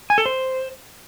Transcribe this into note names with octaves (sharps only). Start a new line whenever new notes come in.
G#5
A4
C5